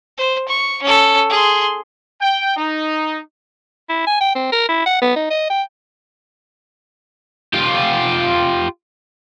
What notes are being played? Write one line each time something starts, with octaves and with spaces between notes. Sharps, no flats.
C5
C#6
C#4 A4
G#4 C6
G5
D#4
E4
G#5
G5
C4
A#4
E4
F#5
B3
D#4
D#5
G5
F4 G4